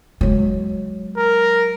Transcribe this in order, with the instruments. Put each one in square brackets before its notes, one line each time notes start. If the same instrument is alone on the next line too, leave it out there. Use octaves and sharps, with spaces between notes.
[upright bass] F#3 G#3
[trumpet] A#4